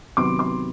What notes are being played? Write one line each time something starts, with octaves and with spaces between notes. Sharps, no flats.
C3 D#3 F#3 B3 C6 D6
C6 D6